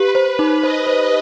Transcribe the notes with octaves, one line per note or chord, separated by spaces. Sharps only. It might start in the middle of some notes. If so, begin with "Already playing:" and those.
Already playing: G4 B4
C5
D#4
C5 D#5
C5